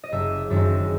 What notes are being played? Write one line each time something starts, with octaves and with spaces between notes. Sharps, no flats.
D#5
F#1 E5
F#2 D#3 G#3 C4 E5